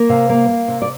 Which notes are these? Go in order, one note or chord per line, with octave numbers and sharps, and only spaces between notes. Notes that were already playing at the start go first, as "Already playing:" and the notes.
Already playing: A#3
C3 F5
A#3
A#3
C3
D5